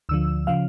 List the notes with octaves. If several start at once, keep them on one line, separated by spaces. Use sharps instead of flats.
D2 D3 F3 E6
C#3 F3 F5